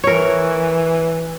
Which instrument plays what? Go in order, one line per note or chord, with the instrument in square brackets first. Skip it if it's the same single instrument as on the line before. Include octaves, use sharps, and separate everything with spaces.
[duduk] E3 [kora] A#4 C#5